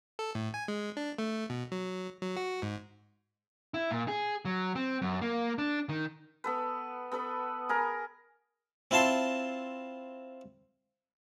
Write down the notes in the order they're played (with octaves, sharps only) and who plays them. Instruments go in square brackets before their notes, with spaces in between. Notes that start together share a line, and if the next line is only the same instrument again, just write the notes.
[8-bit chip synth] A4
A2
G#5
G#3
D4
A3
B2
F#3
F#3
F#4
G#2
[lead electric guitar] E4
A#2
G#4
F#3
C4
F#2
A#3
D4
D#3
[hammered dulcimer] B3 A4 B4
B3 A4 B4 B5
G#4 A#4 B5
[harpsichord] C4 E4 F4 A5 C6